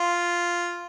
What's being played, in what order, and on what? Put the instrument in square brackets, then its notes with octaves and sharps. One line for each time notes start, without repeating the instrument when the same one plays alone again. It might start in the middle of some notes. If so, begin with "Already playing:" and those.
Already playing: [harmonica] F4